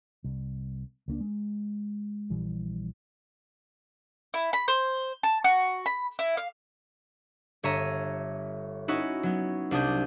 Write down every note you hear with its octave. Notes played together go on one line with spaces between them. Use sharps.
C2
C#2 A#3 D4
G#3
A#1 E3 G3
E4
B5
C5
A5
F#4
B5
E4
F5
G1 C#5 E5 A#5 D#7
C#4 D#4 E4 F#4
F#3 B3
C2 D4 D#6 G6